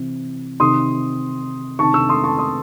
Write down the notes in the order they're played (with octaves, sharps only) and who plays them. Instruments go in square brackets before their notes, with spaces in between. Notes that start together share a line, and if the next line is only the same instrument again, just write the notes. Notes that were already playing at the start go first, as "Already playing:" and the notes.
Already playing: [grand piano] C3 E3
C3 D#3 C6 D#6
C3 D#3 A5 C#6
C#6 E6
C6 D#6
A5 C#6
C6 D#6